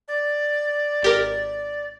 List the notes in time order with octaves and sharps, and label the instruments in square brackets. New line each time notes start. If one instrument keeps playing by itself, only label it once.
[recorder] D5
[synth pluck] G#1 G4 A#4